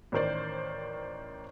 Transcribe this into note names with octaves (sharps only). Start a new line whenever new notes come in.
A1 D#3 A#4 C5 D5